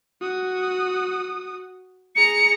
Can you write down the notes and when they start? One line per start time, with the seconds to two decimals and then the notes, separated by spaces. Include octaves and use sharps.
0.21 F#4 D#6
2.16 G#4 A#5 C#7